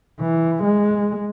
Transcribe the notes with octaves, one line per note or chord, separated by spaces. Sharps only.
E3
G#3